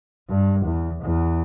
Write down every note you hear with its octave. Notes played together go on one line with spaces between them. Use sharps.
G2
E2
E2